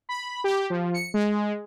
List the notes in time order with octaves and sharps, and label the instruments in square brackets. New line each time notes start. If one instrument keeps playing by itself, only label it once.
[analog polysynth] B5
G4
F3
C#7
G#3